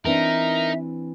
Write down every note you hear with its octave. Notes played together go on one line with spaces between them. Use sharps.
E3 C4 D4 D#4 A#4 E5